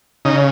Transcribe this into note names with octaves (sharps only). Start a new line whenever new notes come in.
C#3 D#4